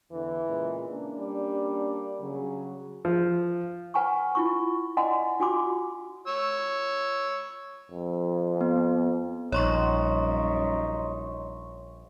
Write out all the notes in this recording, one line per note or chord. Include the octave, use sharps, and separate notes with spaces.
E2 D3 E3
A#2 C#3 G#3
A#3 C#4 D4
G3
C#3 F#3
F3
B4 F#5 G#5 A#5 C#6
E4 F4 C#6
D5 D#5 F#5 G#5 A#5 C6
F4 F#4 G#5 C6 D6
C#5 E6
F2
B3
A#1 F#2 G3 D#4 C#5 C6 C#6